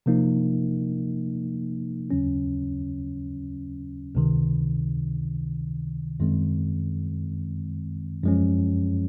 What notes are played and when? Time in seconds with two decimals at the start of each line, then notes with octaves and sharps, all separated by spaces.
0.06 C3 F3 A#3 D#4
2.11 D#2 C#3 F#3 C#4
4.15 C#2 C3 D#3
6.20 F#2 D#3 G#3 C4
8.23 F#2 F3 G#3 C#4